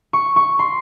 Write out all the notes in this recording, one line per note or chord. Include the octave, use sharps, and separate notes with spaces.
C#6
C#6
C6